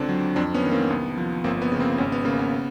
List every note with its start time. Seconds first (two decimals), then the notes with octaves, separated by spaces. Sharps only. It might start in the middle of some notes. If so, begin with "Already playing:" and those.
Already playing: C#2 D3 C4 D4
0.09 F#3
0.36 F2 C4 D4
0.54 B3 C#4
0.63 D#3
0.71 A#3 C4
0.89 C2 B3
1.18 F3
1.44 G1 A#3 C4
1.62 B3
1.72 C#3
1.80 A#3 C4
1.98 G#1 B3 C#4
2.12 B3
2.25 C#3 A#3
2.39 B3